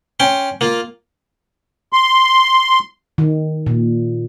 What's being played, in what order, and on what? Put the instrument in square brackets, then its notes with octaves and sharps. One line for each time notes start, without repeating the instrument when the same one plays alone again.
[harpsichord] C#4 G5 C6
A#3 F4
[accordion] C6
[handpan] D#3
A#2